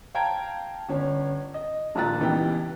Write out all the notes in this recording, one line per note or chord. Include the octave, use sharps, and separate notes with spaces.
F5 G5 A5 A#5 G#6 D7
G1 C#4
D#5
D#1 A#1 A#2 A#5 F#6 A6
C#2 E3 B3 D#4 G4 G5